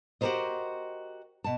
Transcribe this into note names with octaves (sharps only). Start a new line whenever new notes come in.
F#4 G4 A4 A#4 C5 D#5
B2 A5